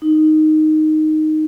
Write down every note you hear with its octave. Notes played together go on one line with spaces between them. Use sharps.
D#4